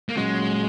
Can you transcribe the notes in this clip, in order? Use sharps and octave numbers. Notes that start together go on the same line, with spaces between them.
A#3
A#2 F#3 G#3 C#4 F#4